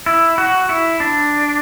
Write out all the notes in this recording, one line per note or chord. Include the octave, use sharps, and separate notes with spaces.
E4
F#4
E4
D4